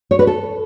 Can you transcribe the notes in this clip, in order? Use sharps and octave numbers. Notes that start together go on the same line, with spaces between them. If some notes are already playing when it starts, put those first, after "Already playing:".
C#5
B4
A4